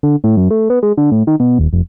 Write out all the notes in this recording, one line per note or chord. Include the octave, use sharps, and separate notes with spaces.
D3
A2
F#2
A3
B3
G#3
D3
A2
D#3
B2
D#1
F1